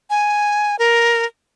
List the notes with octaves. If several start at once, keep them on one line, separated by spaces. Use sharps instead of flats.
G#5
A#4